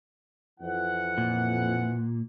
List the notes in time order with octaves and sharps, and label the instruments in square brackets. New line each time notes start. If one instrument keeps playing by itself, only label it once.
[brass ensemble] F2 E3 F#5
[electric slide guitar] A#2